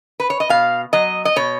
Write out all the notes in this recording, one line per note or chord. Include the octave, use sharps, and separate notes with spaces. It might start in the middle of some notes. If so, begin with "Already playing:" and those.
B4
C#5
D#5
B2 F5
F#3 D#5
D#5
B2 C#5